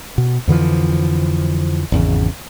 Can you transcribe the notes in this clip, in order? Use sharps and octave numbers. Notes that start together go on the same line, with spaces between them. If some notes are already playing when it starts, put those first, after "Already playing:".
B2
F2 D3 E3 F3
G#1 E2 C#3